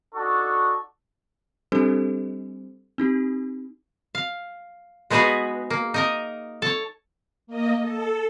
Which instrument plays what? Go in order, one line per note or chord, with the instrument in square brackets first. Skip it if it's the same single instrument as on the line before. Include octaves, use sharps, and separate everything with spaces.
[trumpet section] D4 D#4 F#4 A4 C#6
[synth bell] G3 C4 D4 G4 A4 C5
C4 D#4 G4
[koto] F5
G#3 B3 D#4 F#4 G#4 B4
A#3
D#4 A#4 D#5
A4 C#5
[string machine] A#3 D#5
A4